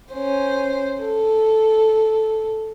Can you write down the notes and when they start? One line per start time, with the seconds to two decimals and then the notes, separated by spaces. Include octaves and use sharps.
0.13 C#4 C5
1.02 A4